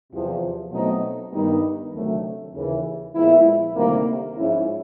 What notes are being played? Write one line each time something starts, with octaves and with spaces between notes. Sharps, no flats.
E2 C3 F3
B2 F#3 A3 C4 D#4
G2 D#3 G3 B3 D#4
D2 C3 D#3 F#3 A3
D#2 C#3 E3
A#2 F3 G#3 B3 E4
D2 C3 D#3 G3 A#3
G#2 F3 G#3 C#4 E4